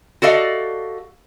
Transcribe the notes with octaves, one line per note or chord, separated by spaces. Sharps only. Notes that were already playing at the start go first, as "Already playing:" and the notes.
F#4 G4 A4 D5 D#5 F5